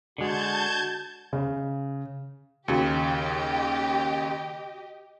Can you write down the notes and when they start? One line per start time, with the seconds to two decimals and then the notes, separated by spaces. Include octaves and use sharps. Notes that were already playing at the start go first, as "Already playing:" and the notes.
0.18 D3 G#3 F#4 A5 G6 G#6
1.33 C#3
2.68 D#2 C#3 F#4 G4 D#5 C#7